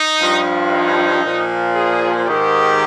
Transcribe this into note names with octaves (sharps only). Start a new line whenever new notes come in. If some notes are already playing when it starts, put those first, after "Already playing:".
Already playing: D#4
G2 F3
D#4
A#2 F3
G#4
G#2 D#3 G4